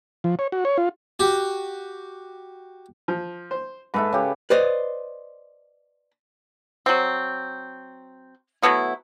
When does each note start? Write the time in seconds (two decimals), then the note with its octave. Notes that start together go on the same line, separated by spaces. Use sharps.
0.24 F3
0.39 C#5
0.52 F#4
0.65 C#5
0.78 F4
1.20 F#4 G4
3.08 F3
3.51 C5
3.94 G#2 E4 A4 B4
4.13 C#3 G4
4.50 B4 C5 D5 D#5
6.86 F#3 C4
8.62 F#3 A3 B3 E4